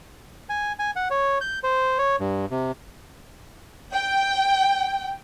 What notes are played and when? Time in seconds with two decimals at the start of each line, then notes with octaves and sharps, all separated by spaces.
0.50 G#5
0.79 G#5
0.96 F#5
1.11 C#5
1.41 G6
1.64 C5
1.99 C#5
2.20 G2
2.51 C3
3.91 G5